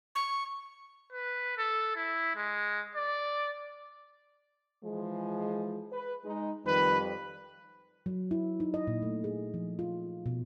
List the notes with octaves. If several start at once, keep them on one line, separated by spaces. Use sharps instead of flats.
C#6
B4
A4
E4
G#3
D5
E3 F3 G#3
B4
G#3 D#4
F2 D#3 G3 B4
F#3
E4
D#4
D#5
A#2
A3
G#4
F3
F4
B2